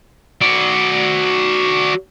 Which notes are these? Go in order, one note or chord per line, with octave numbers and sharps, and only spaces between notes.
F#4 D5